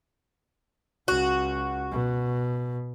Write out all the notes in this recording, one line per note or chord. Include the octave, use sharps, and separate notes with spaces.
C#2 F#4
B2